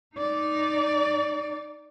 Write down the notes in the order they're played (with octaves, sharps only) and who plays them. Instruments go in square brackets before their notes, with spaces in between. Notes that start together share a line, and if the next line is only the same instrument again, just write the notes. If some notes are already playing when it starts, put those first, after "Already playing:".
[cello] D#4 D5